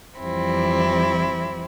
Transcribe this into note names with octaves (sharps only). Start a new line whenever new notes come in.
F2 E3 G3 C4 E4